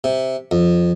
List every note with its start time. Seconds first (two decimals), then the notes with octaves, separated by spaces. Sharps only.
0.04 C3
0.51 F2